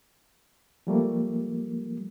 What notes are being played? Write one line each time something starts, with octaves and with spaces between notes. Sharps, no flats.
F3 G3 A3 A#3